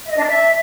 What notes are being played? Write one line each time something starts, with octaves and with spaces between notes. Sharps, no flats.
E5
D#5
D4
D5
E5